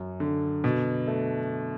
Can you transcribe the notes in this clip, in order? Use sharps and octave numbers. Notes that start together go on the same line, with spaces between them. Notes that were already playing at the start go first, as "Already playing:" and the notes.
Already playing: F#2
D3
B2
A3